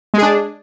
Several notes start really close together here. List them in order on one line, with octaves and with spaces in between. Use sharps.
G#3 G#4 D4